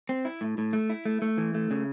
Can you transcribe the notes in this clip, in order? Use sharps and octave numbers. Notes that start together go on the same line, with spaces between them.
C4
E4
A2
A2
A3
E4
A3
A3
E3
A3
C#3